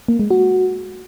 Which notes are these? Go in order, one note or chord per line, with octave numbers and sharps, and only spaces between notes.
A#3
G#3
F#4